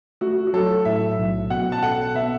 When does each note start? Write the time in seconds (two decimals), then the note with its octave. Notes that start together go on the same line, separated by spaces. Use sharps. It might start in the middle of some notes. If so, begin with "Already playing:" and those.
0.21 A3 F#4
0.47 F#4
0.53 F#3 A4
0.85 A2 E5
1.18 B1
1.50 B2 F#5
1.72 A5
1.83 A4 F#5
2.15 B3 E5